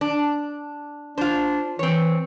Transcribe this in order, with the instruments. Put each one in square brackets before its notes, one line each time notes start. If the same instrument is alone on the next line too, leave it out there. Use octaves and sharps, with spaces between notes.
[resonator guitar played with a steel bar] D4
[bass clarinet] D4 [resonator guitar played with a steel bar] F4 C5
[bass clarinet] E3 [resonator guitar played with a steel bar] C4 C#5